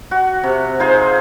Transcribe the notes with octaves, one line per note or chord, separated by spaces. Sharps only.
F#4
C3
D#4 F4 G#4 C5